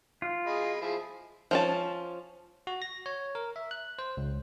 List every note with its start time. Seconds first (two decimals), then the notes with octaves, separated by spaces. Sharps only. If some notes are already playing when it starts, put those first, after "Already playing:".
0.22 F4
0.47 G#4 D#5 B5
0.82 F3 E4 G#4
1.51 F3 C#4 A5
2.67 F#4
2.82 A#6
3.06 C#5
3.35 A#4
3.56 E5
3.71 F#6
3.99 C5
4.17 C#2